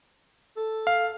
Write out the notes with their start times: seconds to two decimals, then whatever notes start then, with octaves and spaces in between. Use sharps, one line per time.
0.57 A4
0.87 F5